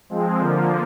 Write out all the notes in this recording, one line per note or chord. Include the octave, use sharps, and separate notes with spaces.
F3 G#3 C4
D3 F3 A#3